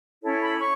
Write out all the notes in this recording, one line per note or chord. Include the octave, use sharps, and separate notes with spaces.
C#4 E4 A4 C#5
B5
D6
C#5 C#6